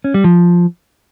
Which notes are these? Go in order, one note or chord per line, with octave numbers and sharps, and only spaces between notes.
C#4
G3
F3